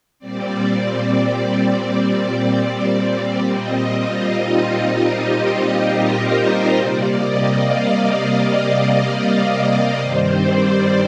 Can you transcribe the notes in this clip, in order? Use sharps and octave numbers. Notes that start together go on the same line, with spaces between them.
A#2 G3 C4 D5
A#2 G3 C4 D#5
F4
D#4
F4
G4
G4
A#4
C5
C3 G3 A#3 D5
D#5
F5
F5
D#5
D5
G2 D#3 G3 C4 C5
D5